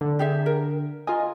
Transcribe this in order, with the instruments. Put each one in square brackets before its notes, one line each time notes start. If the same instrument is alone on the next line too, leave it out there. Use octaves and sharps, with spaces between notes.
[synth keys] D3
[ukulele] G4 G#4 E5
A#4
[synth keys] F4 A#4 D#5 [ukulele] G#5